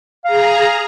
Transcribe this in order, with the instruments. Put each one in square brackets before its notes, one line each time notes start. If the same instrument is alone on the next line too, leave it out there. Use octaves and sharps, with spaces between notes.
[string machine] G#4 A#5 [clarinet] F5